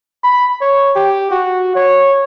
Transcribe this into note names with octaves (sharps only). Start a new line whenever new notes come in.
B5
C#5
G4
F#4
C#5